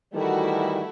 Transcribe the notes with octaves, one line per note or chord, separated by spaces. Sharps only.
D#3 E3 G3 A3 E4 F#4